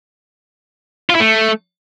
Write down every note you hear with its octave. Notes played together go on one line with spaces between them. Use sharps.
F4
E4
A3